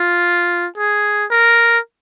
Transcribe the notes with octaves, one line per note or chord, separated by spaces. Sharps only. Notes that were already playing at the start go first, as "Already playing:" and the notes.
Already playing: F4
G#4
A#4